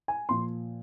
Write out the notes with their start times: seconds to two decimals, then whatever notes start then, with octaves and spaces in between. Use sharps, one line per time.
0.08 G#5
0.29 A#2 F3 C6